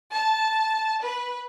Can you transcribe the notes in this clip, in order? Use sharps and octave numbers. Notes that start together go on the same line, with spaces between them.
A5
B4